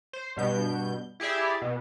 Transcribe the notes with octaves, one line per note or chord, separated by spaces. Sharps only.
C5
G2 B2 G6
E4 G4 G#4 D5 E5
B2